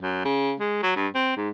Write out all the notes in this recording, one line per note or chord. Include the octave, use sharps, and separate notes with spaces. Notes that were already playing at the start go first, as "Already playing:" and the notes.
F#2
C#3
G#3
F#3
G2
C4
G#2